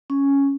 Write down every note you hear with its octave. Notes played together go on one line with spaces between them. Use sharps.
C#4